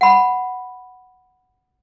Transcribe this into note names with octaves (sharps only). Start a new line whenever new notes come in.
F#5 B5